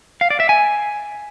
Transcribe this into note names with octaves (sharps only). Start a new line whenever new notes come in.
F5
D5
E5
G#5